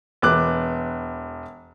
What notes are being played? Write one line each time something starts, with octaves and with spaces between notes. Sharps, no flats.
E1 B3 D6 F#6